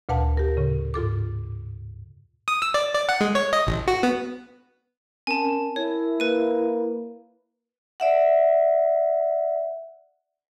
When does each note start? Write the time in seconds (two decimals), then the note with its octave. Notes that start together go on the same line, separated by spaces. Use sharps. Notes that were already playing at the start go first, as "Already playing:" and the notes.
0.09 D2 A#2 B4 F5 F#5 A5
0.37 G4 A#4
0.57 A2 C#3
0.94 G#2 F4 A4 D6
2.48 D#6
2.62 E6
2.74 D5
2.94 D5
3.09 F#5
3.21 G#3
3.35 C#5
3.53 D#5
3.67 A1
3.88 F#4
4.03 B3
5.27 C4 C#4 A#4 G#5 A5
5.76 E4 A#4 C#5
6.20 A#3 B4 D#7
8.00 D5 E5 F#5